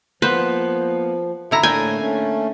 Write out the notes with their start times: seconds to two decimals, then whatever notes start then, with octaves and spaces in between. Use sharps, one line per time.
0.22 F3 A#3 B3 B4 C5
1.51 D3 E4 E5 A#5
1.63 A2 A3 A#3 D4 G5 G#5
1.99 A3 C#4